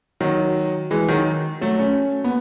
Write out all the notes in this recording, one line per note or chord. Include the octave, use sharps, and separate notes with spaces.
D#3 F#3
E3 G#3
D#3 F#3
F#3 A3
A3 C#4
B3